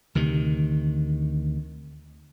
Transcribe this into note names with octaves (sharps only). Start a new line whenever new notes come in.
D2 C3 D#3